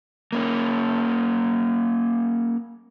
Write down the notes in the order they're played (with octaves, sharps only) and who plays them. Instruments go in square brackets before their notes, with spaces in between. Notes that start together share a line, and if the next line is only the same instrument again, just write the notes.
[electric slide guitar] A#3 C#4